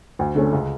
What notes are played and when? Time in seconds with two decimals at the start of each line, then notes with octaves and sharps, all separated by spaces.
0.19 D2
0.35 D3 A3 C#4
0.53 C#2